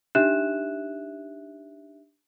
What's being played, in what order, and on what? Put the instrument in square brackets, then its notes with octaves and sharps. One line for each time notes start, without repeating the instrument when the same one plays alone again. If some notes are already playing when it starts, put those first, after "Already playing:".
[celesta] D4 D#4 G4 E5 F#6 E7